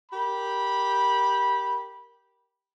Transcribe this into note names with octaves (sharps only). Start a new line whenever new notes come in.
G4 A#4 B5